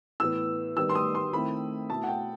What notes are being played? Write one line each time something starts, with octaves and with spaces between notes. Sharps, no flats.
A2 E3 B3 E6
D#3 G3 B3 E6
C6
D#6
C6
D#3 A3 C4 E4 B5
B2 A3 E4 A5
F#5
G5